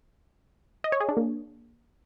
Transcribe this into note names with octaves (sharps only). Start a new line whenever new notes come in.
D#5
C#5
G#4
D4
A#3